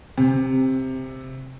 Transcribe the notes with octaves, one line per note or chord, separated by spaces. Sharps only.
C3 C4